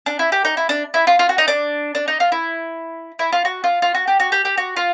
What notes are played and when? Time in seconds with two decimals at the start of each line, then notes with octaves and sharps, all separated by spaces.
0.06 D4
0.19 E4
0.32 G4
0.45 D#4
0.57 E4
0.69 D4
0.94 E4
1.07 F4
1.19 F4
1.29 F#4
1.38 D#4
1.48 D4
1.95 D4
2.08 D#4
2.20 F4
2.32 E4
3.19 E4
3.32 F4
3.45 F#4
3.64 F4
3.82 F4
3.95 F#4
4.07 G4
4.20 F#4
4.32 G4
4.45 G4
4.58 F#4
4.77 F4